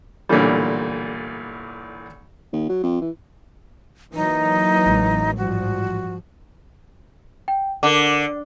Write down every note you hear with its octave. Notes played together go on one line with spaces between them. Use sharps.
B1 A#2 D3 E3 G3
D#2
F#3
F2
E3
E3 F#3 A#3 D#4
A1 G#3
G#2 F3 G3 F#4
G5
D3 A#4 D6